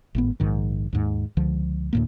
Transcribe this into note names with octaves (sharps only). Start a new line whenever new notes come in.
G#1 A2 B3
A#1 G#2 D#3
D#2 G#2
C#2 D3 F3
D2 A2 A#3